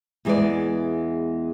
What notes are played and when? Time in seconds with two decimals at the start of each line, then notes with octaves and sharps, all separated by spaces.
0.25 E2 E3 G#3 B3 B4 D5